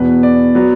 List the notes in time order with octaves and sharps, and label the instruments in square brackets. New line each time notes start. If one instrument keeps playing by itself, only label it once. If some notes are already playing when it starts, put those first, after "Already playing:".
Already playing: [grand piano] E2 B2 B3 B4
D5
F#3 B3